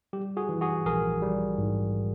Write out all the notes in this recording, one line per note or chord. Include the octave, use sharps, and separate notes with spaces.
G3 G4
F#4 G#4
E3
F#4 G#4
A#1 G#4 A#4
G3
G#2